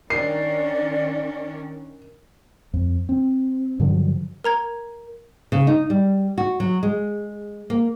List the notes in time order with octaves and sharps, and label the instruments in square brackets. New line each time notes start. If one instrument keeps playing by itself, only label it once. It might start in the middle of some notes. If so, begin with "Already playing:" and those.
[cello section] D#3 C#4 D4 [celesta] A#4 [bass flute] D5 [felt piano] C7
[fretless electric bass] F2
C4
G2 D3 F3 F#3
[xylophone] A#4 A#5 G#6
[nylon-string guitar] C#3
D#4
G3
F#4
F#3
G#3
A#3